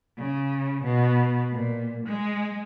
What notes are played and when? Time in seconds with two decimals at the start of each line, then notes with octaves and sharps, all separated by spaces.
0.18 C#3
0.83 B2
1.52 A#2
2.06 G#3